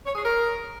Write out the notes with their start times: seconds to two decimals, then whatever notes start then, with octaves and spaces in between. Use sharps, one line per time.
0.05 C#5
0.15 G#4
0.25 A#4